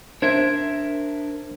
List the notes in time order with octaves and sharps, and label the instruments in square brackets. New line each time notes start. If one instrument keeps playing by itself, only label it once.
[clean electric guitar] D4 A#4 E5 [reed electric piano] C5 G#6